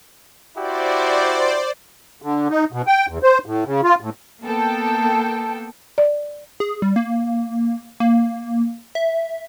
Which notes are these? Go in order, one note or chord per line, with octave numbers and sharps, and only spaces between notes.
E4 F#4 G4 C5 D5
D3
D#4
B2
G5
E2
C5
A2
C#3
F4
A2
A#3 B3 A4 G5
D5
G#4
G3
A#3
A#3
E5